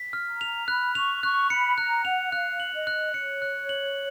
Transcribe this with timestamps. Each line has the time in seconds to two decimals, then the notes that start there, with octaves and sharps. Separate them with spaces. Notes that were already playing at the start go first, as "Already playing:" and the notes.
Already playing: B6
0.13 F6
0.27 A#5
0.41 F7
0.68 B5 F#6
0.95 C#6 F7
1.23 C#6 F#6
1.50 B5 C#7
1.78 A#5 F#6
2.05 F#5 F7
2.32 F5 F#6
2.60 F#7
2.73 D#5
2.87 F#6
3.14 C#5 C#7
3.42 F#6
3.69 F#7